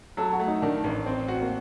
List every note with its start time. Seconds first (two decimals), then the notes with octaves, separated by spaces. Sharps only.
0.17 F#3 A4
0.33 F#4
0.39 A3
0.48 D#4
0.62 D#3 D4
0.84 A1
1.06 C4
1.28 F#4
1.41 A#3